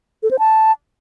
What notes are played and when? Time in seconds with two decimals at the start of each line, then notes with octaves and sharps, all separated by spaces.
0.23 A4
0.31 C5
0.39 A5